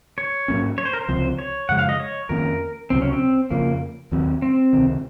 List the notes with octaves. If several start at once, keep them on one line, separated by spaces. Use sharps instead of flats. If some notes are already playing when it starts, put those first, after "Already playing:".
C#5
G#2 F#3 A#3 C#4
C#5
C5
A#4
C5
C#2 C3 F3 C4
C#5
F#2 C#3 F3 G#3 F#5
F5
D#5
C#5
F2 D#3 A#3 C#4 A#4
C#2 C3 F#3 C4
C#4
C4
F2 C#3 F3 A#3
D#2 D#3 F#3 C4
C4
C#2 C3 D#3